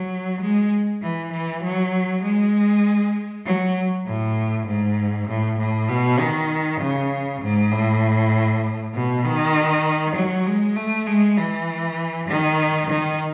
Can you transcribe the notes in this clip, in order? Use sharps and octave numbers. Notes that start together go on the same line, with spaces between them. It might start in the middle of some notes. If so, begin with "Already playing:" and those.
Already playing: F#3
G#3
E3
E3
F#3
G#3
F#3
A2
G#2
A2
A2
B2
D#3
C#3
G#2
A2
B2
D#3
F#3
G#3
A3
G#3
E3
D#3
D#3